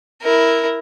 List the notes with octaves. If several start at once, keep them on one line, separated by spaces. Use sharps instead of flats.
E4 A#4